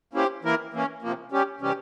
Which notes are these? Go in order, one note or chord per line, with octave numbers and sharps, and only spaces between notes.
A#3 C#4 E4 G4 C5
E3 A#3 E4 A#4
E3 A#3 C#4
C3 F3 A#3
G3 C#4 G4
C3 E3 G3 C#4 G4